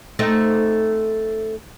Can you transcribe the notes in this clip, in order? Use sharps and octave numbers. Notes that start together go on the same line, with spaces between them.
A3 C4 D#4